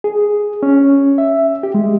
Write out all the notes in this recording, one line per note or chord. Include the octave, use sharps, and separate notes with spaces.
G#4
C#4
E5
G4
G#3